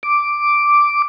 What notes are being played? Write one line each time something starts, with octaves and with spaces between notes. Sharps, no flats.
D6